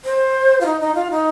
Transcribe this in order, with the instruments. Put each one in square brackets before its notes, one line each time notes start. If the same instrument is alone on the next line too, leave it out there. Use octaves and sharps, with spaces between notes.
[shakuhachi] C5
F4
D#4
D#4
F4
D#4